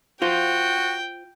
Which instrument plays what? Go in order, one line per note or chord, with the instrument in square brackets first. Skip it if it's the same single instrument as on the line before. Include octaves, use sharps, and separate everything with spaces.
[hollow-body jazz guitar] F4 C5 [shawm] F#4 [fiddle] G5